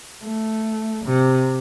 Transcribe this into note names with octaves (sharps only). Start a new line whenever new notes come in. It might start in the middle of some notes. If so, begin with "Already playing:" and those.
A3
C3